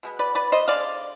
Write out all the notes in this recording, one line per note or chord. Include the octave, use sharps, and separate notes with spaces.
B2 G#3 B3
B4 D5
B4 D5
C5 D#5
D3 G#3 D5 F5